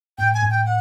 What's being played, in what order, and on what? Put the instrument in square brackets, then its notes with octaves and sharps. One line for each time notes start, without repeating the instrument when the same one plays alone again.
[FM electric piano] A2 [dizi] G5
[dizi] G#5
[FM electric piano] A2
[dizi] G5
F#5